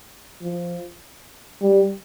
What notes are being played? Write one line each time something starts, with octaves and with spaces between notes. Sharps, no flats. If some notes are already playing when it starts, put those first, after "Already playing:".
F3
G3